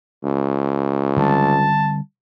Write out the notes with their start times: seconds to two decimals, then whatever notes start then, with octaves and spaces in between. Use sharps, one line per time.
0.23 C#2
1.16 D3 G3 C4 A5